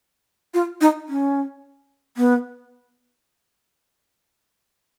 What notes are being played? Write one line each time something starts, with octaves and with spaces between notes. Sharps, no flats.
F4
D#4
C#4
B3